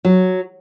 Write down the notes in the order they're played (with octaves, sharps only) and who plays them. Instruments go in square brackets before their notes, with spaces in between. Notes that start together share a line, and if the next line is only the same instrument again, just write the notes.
[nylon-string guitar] F#3